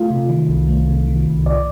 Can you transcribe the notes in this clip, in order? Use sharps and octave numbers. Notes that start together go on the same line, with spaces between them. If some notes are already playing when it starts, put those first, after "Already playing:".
Already playing: A3 F4
C3
D#3
C2
A3
C3
D#3
C2
A2 D5